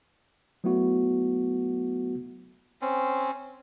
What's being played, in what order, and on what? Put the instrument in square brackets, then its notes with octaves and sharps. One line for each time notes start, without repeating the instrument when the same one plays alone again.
[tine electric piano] F#3 A3 B3 E4 F#4
[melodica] C4 C#4